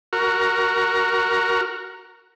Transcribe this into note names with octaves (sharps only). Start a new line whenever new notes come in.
F#4 A#4